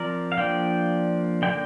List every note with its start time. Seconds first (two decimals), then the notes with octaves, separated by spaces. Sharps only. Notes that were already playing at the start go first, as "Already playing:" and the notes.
Already playing: F3 C4 A#4 D5
0.32 F5
0.37 F3 A#3 D4 D5 G5
1.42 D3 A#3 D4 D5 G5